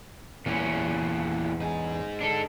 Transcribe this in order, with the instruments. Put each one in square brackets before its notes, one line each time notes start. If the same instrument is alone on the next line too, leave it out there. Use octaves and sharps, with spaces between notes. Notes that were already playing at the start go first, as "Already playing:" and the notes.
[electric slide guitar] E2 C#4 [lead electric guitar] A#2 E3
[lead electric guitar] D#4 G#4
[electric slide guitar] D4 A4